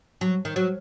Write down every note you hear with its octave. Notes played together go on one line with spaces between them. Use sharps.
F#3
D#3
F#3